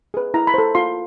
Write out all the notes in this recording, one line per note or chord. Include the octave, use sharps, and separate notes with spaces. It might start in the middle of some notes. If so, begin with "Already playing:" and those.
G#4 B4
E4 A#5
B5
A4 C5
F4 C6